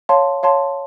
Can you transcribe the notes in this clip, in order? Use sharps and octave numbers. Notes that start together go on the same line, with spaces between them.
C#5 F5 A5 C6
C#5 F5 A5 C6